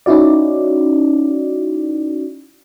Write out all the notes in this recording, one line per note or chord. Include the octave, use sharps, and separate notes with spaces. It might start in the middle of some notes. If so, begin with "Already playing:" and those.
C#4 D#4 E4 F#4 D5